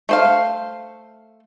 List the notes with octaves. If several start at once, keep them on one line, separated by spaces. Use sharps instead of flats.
A3 C5 F5